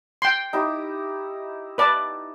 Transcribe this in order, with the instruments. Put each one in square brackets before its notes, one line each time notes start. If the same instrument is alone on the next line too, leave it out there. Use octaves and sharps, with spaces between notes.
[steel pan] G5 C6
[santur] D#4 E4 G4
[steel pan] B4 D5 A5